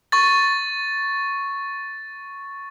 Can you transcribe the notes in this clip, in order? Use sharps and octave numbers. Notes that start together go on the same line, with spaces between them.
C#6 A6